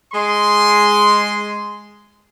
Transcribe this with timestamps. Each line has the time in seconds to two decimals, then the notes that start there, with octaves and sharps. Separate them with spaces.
0.13 G#3 C6